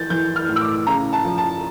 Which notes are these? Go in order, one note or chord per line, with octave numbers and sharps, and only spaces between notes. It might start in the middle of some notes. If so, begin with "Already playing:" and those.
Already playing: E3 G6 A6
E3 G6
F6
A2
E6
D6
C#3 A#5
A5
F3
A5